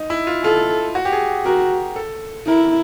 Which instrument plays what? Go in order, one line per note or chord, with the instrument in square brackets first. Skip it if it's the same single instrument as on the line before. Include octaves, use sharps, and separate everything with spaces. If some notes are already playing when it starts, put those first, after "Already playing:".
Already playing: [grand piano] D#4
E4
F4
[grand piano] F4 [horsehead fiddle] A4
[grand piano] F#4
G4
G#4
[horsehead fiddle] F#4 [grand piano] A#4
[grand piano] A4
[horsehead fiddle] E4 [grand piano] A#4